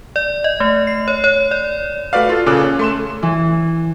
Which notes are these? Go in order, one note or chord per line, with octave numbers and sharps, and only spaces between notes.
D5
D#5
A3
C7
C#5
C#5
D5
A3 F#4 B4 D5 F5
F4 A4
A#2 C#3 A4 D6 F#6
C#4
A3 C6 E7
E3